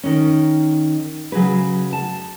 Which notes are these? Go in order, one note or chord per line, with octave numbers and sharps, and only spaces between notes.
D#3 C#4
C#3 F#3 G#4 B4
A5